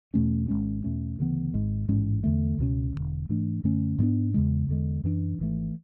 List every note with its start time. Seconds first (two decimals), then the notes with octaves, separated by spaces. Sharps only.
0.14 E2 B2 A3 C#4
0.48 G#1 G#2 G#3 C#4
0.84 E2 B2 A3 C#4
1.19 D2 C#3 E3 B3
1.54 G#1 G#2 G#3
1.89 A1 G#2 G#3 C#4
2.24 E2 D3 A3
2.58 C#2 B2 A3 C#4
2.94 E1 E2 D3
3.29 G#2 E3 A3 D4
3.64 F#2 D3 A3 C#4
3.99 G#2 G#3 B3 D4
4.34 E2 C#3 G#3
4.68 E2 D3 G#3
5.04 F#2 E3 B3 D4
5.39 G#1 G#2 E3 A3